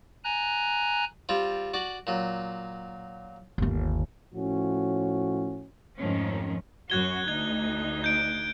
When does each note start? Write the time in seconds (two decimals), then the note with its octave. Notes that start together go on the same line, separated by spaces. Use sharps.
0.24 G#5 A#5 F#6
1.29 G3 C4 F4
1.74 F#4 D5
2.07 A#2 F#3
3.58 G1 D#2
4.33 A2 F3 C#4 F#4
5.99 F2 G#2 D#3 F3 A3 C#4
6.90 F#2 F#4 F#6 G#6 G7
7.28 D2 D#4 G#6
8.04 G6 D7